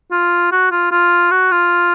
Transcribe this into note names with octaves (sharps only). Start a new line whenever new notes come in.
F4
F#4
F4
F4
F#4
F4